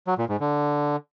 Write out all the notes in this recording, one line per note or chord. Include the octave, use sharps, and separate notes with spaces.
F#3
A#2
G#2
D3